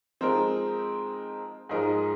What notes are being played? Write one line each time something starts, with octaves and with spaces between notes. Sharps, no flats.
F3 G#3 C4 D#4 A#4
G#2 F3 G#3 D#4 A#4